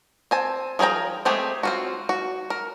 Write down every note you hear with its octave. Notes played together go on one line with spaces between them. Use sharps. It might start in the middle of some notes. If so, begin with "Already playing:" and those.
C4 G#5 A5
F3 G#4 A#4 G5 A#5
G#3 A3 C4 G4 G#4
C4 F4 F#4
F#4
A#4